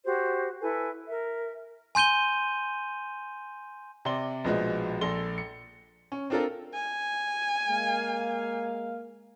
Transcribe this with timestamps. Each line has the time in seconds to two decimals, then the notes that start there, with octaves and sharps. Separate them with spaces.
0.04 F#4 G4 C5
0.61 E4 A4 B4 G#5
1.08 A#4 E5
1.95 G#5 C6 G6 D#7 G7
4.05 C3 D5 C6 G7
4.44 A#1 B2 F3 G#3
5.01 A#1 A4 C6 A#6 G7
5.38 C#7
6.12 C#4
6.30 C4 D4 F4 A4 A#4
6.74 G#5
7.67 G#3 A#3 F5